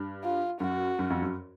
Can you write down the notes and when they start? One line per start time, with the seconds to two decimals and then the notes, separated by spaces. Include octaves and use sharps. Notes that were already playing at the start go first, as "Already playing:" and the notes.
Already playing: G2
0.23 F4
0.60 F#2 F#4
0.99 F#2
1.10 F2
1.22 F#2